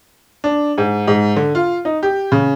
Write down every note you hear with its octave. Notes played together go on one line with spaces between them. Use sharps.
D4
G#2
G#2
D3
F4
D#4
G4
C#3